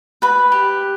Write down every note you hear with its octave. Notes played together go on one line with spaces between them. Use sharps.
B4 B5
G4